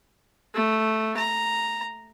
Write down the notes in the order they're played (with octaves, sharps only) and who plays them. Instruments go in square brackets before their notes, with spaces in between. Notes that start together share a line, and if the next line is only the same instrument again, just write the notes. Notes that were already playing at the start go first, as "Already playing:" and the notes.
[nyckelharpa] A3
A#5